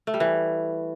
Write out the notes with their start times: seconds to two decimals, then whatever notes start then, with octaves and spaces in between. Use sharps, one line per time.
0.07 A3
0.14 G3
0.20 E3